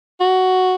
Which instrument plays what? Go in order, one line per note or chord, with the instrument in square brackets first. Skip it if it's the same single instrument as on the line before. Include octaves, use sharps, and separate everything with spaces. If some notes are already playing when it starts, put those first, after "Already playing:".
[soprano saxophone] F#4